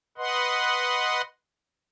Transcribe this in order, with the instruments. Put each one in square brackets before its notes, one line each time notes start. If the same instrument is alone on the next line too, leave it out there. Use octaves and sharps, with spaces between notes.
[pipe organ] B4 D#5 F#5 C6